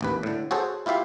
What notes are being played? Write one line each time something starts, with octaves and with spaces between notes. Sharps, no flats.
A1 D#2 B4
A2 D3
F#4 G#4 A4 C5 C#5
E4 F4 G4 E5 F5